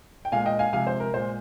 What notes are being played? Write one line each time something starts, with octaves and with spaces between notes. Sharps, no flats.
G5
A#2 G#3 F5 G#5
D#5 G5
F5 G#5
C3 F3 G#3 F5 G#5
C5
A#4
A#2 G#3 C5